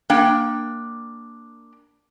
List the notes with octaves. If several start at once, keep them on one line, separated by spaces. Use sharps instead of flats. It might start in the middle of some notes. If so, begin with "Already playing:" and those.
A#3 D4 G5